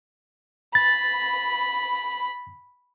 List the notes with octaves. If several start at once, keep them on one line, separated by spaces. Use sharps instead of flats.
B5 A6